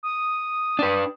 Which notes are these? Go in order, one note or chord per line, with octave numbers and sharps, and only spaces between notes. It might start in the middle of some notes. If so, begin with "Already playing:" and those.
D#6
D4 B4